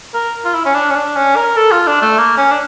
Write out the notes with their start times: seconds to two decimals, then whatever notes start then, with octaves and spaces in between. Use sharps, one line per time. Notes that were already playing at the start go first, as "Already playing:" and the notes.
0.14 A#4
0.45 F4
0.54 E4
0.65 C#4
0.75 D4
0.90 C#4
0.96 D4
1.16 C#4
1.36 A#4
1.57 A4
1.72 F4
1.87 D4
2.02 A3
2.18 A#3
2.37 C#4
2.51 D4